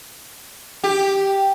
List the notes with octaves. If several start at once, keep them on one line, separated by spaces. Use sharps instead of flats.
G4